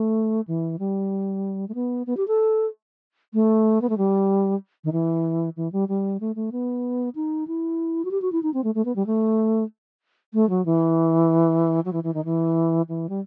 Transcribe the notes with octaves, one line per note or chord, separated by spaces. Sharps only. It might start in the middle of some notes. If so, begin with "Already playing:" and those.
Already playing: A3
E3
G3
A3
B3
B3
G4
A4
A3
B3
A3
G3
D#3
E3
E3
G3
G3
A3
A3
B3
D#4
E4
F#4
G4
F#4
E4
D#4
C4
A3
A3
B3
G3
A3
A3
F#3
E3
F#3
E3
E3
D#3
E3
E3
G3